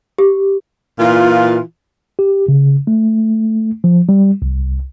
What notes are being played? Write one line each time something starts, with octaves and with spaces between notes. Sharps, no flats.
G4
A#2 E3 F4
G4
C#3
A3
F3
G3
C2